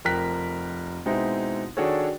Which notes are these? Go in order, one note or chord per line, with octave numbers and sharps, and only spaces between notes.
F1 F3 A#4 G5 F#6 B6
B2 G#3 C4 D#4 E4
D#3 D4 F#4 G#4 A4 C#5